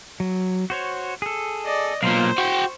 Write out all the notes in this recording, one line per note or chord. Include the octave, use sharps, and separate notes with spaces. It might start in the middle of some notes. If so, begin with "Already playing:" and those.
F#3
F#4 C5 C#5
G#4 A4
D5 D#5
B1 A#2 C5 F5
F#4 G5 C#6